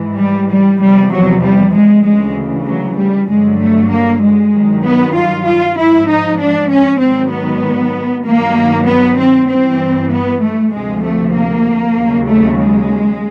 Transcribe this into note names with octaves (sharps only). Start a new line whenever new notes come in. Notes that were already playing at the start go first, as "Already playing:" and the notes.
Already playing: G#2 E3
G3
G3
E2 C3 F3 G3
F#3
G3
G#3
D2 C#3 E3 G#3
F#3
G3
G2 D3 F#3 G#3
A3
A#3
G#3
G2 D#3 F#3
B3
F4
F4
G#2 F3 E4
D#4
D4
C#4
G#2 D#3 F#3 C4
B3
G2 D#3 F#3 A#3
B3
C4
G2 E3 C4
B3
A3
D2 C3 F3 G#3
A3
A#3
D#2 C#3 F#3
A3
G#3